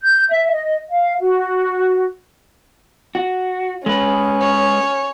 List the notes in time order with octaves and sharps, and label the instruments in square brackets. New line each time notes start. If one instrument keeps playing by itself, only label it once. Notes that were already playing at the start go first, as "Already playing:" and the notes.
[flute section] G6
E5
D#5
F5
F#4
[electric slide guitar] F#4
[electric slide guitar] G#3 B4 [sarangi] C#4
[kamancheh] C#5